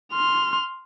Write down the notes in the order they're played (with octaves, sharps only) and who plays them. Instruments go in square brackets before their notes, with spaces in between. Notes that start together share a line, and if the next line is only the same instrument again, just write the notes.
[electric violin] C6 F6